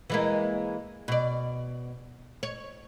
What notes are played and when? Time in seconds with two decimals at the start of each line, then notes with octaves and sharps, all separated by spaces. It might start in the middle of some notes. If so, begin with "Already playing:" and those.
0.10 E3 G#3 A#3
1.08 B2 D5
2.43 C#5